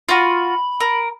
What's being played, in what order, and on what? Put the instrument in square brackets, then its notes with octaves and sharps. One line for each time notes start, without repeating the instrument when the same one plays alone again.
[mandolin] F4 F#4 [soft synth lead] B5
[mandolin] A#4